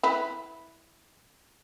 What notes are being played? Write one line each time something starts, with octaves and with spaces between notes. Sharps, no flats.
E4 B4